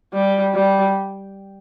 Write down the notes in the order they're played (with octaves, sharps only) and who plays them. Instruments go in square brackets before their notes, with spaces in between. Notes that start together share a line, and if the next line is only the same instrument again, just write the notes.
[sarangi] G3
G3